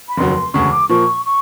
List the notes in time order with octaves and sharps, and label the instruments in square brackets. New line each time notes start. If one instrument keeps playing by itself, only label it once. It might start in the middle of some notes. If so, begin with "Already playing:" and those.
[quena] B5
[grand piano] F1 D#2 C#3 F#3 [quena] C6
[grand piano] E1 D2 C#3 [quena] C#6
[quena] D6
[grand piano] A#2 F3 A#3 [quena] C#6
[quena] C#6